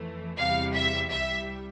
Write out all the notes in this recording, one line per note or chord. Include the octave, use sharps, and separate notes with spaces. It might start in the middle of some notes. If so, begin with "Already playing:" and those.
Already playing: F2 E3 A3
E2 C3 G3 F5
E5
C2 C3 G3 E5